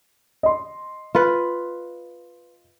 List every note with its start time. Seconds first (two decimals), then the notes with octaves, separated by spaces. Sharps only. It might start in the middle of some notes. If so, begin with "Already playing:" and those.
0.43 D#5 C6
1.15 F4 B4